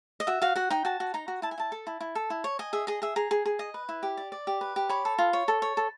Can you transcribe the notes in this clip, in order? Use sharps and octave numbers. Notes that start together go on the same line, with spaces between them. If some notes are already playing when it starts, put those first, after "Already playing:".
D#5
F#4 E5
F#4 F5
F#4 F#5
D#4 G5
F#4 A5
F#4
D#4 A#5
F#4
E4 A5
G#5
E4 A5
A4
E4
E4
A4
E4
C#5
D#5 G#5
G#4 E5
G#4 D#5
G#4 E5
G#4 A#5
G#4
G#4
D#5
B4
E4
G4
D5
D5
G4
B4
G4
C#5 B5
A4
F4
C#5
A4
C#5
A4